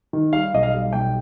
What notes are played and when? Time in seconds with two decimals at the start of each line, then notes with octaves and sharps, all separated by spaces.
0.13 D#3
0.33 G3 F5
0.54 B1 D#5
0.63 F5
0.73 G3
0.93 B1 G5